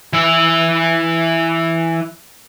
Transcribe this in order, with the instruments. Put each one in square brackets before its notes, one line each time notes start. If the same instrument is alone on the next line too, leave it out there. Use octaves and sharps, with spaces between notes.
[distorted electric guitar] E3 E5